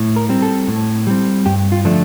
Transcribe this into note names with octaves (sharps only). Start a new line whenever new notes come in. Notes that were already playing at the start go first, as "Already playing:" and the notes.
Already playing: A2
A#4
G3 C4
A4
A2
G3 C4
G2 G4
F4
D3 F3 A3 D4